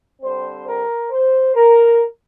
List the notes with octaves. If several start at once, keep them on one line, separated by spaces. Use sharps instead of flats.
D3 G3 C4 C5
A#4
C5
A#4